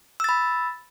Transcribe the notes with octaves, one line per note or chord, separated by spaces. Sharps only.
B5 E6 A6